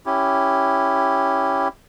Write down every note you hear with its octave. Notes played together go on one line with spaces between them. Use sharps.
C#4 E4 G4